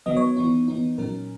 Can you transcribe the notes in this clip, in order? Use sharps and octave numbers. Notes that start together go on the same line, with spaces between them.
D#3 F#3 B3 D#5
C#5
E3 B3 D#4
E3 B3 D#4
A#2 F#3 C#4 A#4